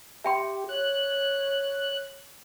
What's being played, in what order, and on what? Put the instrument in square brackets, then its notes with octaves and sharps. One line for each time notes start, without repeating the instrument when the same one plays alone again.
[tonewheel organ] G4 [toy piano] E5 G5 C6
[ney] C#5 [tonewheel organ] F#6